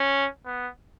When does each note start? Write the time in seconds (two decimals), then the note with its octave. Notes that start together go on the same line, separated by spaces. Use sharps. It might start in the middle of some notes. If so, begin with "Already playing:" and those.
Already playing: C#4
0.46 B3